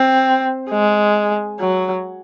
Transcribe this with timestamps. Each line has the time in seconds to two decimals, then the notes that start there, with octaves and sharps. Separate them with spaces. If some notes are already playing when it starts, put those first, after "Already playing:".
Already playing: C4
0.70 G#3
1.60 F#3